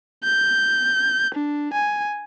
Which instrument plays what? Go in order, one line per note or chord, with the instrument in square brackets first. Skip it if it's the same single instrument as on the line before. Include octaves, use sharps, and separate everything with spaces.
[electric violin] G6
D4
G#5